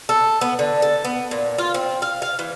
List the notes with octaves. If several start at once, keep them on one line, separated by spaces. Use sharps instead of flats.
A4
B3
D3
A4
B3
A#2
F4
C4
F5
F5
E3